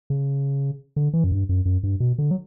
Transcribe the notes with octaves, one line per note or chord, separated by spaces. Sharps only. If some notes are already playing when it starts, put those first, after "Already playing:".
C#3
D3
E3
F#2
G2
F#2
F#2
G2
B2
D3
F#3